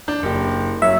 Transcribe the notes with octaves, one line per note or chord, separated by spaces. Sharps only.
D4 G6
F#1 G4
F#2 C#5 E5